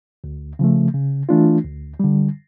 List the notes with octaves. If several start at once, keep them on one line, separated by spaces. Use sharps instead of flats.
D2
C#3 F3 A3
C#3
E3 A3 D4 F4
D2
D3 G3